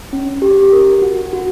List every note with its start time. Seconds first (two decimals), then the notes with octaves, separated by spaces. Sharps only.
0.13 C#4
0.42 G4
0.72 A#4
1.02 F#4
1.33 F#4